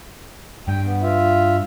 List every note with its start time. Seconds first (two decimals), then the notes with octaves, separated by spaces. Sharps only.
0.68 G2 G5
0.85 B3
1.02 F4 E5